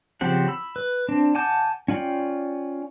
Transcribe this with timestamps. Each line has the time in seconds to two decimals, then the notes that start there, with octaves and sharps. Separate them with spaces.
0.21 C#3 F3 C4 G4 F#5
0.48 B5 E6
0.76 B4
1.09 C4 D4
1.35 F#5 G#5 A5 D6 G6
1.88 C#4 F4 D5 G5